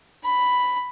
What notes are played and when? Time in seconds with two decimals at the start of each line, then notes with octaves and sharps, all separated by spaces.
0.25 B5